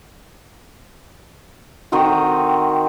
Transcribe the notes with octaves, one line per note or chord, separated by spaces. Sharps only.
D#3 C4 F#4 G5